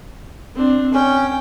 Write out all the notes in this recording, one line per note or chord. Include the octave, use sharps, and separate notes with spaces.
C4 D4
C#4 G5